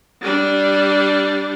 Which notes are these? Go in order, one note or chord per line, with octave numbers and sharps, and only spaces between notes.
G3 D4